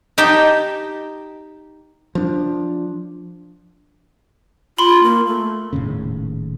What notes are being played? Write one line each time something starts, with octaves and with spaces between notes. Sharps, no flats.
D#4 G4 G5 A5
F3 D4
F4 B5 C6
A#3
A3
D#1 D#2 A2 C#3